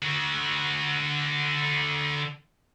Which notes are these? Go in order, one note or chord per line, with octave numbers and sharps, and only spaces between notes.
D3 F#4